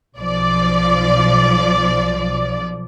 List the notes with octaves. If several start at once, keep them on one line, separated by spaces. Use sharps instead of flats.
B1 F3 D5